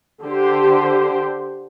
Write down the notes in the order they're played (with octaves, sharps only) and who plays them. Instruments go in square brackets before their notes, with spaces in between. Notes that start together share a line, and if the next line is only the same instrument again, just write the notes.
[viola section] D3 G4 C5